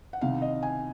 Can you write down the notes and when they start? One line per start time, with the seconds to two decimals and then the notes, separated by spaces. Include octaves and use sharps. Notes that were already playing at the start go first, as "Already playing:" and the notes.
0.13 F#5
0.21 C2 C3 D#3 F5
0.42 D#5
0.63 G#5